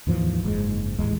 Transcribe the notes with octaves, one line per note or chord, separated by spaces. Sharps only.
D#2 G#2 E3 F3
F#1 G#2 G#3
A1 D#2 G#3